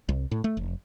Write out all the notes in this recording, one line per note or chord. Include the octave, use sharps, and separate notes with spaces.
C2
A2
A3
F1